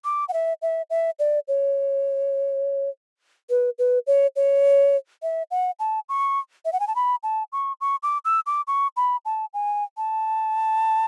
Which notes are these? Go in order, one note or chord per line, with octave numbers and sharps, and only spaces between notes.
D6
F#5
E5
E5
E5
D5
C#5
B4
B4
C#5
C#5
E5
F#5
A5
C#6
E5
F#5
G#5
A5
B5
A5
C#6
C#6
D6
E6
D6
C#6
B5
A5
G#5
A5